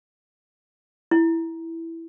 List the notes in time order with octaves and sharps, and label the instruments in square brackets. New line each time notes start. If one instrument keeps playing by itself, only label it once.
[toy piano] E4